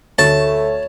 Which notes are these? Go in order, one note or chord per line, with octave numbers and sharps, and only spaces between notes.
D2 A3 C#5 A5